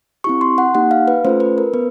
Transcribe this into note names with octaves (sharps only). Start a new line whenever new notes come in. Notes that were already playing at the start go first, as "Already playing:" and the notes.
C4 E4 G4 C#6
C6
F#5
A#3 D#4 G4 F#5
F5
B4
A3 C#4 F4 A4 C5
B4
A#4
B3 B4